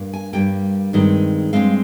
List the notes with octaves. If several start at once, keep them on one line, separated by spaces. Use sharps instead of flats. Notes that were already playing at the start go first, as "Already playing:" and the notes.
Already playing: G2 A#3
G#5
G2 G3 A#3 G5
G2 D#3 G#3 C4
G2 D#3 G#3 C4 F5